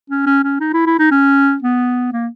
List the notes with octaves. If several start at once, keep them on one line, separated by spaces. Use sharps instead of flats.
C#4
C#4
C#4
D#4
E4
E4
D#4
C#4
B3
A#3